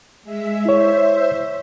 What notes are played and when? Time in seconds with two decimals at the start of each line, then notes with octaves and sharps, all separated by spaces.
0.23 G#3 E5
0.65 E4 C5 C#5 E5